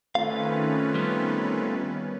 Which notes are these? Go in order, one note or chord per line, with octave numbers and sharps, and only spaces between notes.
D#3 A3 C4 C#4 F4 B4 F5
G3 B3